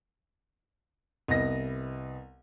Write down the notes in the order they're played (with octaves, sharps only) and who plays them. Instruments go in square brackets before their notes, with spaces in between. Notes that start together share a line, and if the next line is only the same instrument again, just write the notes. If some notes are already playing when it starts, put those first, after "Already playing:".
[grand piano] C2 B3 D#5 A#6